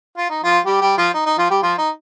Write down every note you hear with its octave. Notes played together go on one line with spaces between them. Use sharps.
F4
D#4
F3 F4
G3 G4
G3 G4
F3 F4
D#4
D#4
F3 F4
G3 G4
F3 F4
D#4